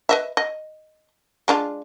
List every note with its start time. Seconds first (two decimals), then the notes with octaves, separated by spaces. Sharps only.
0.09 B4 D#5 E5
0.37 D#5
1.48 G#3 D4 F4